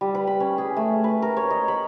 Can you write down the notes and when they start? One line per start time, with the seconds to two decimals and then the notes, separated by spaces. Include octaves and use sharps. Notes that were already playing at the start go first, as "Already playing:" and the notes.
0.01 G3
0.15 B4
0.27 B5
0.40 C#4
0.58 G#4
0.76 A3
1.04 B4
1.22 A#4
1.37 C#5
1.50 D#5
1.68 B5